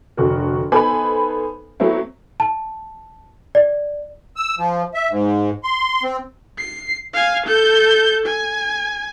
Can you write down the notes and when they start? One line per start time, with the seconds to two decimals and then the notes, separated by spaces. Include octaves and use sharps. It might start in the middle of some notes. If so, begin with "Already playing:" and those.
0.17 F1 D2 F#4 A4 A#4
0.72 B3 D#4 A4 C5 G#5 B5
1.80 F#3 A3 B3 C4 E4
2.40 A5
3.55 D5
4.36 E6
4.58 F3
4.94 E5
5.10 G#2
5.63 C6
6.03 C4
6.58 C7
7.14 F5 G#5
7.46 A4 G6
8.26 G#5